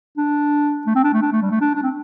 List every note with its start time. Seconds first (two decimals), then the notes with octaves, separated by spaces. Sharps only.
0.17 D4
0.87 A3
0.96 C4
1.04 D4
1.14 A3
1.22 D4
1.32 A3
1.42 G3
1.51 A3
1.61 D4
1.75 D4
1.83 C4